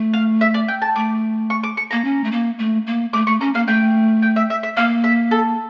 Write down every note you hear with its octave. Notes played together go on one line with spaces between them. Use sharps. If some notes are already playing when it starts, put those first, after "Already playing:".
Already playing: A3
F5
E5
D5
G5
A5
A3 D6
C#6
D6
C#6
A#3 A#5
C#4
A3
A#3
A3
A#3
A3 D6
A3 C#6
C#4 A#5
A#3 F5
A3 G5
G5
E5
E5
E5
A#3 F5
E5
A4